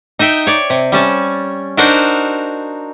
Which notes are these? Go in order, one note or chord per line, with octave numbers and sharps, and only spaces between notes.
D#4 D#5 E5 G5
C#5 D5
C3
G3 C#4 A5
D4 D#4 F#4 A#4 C5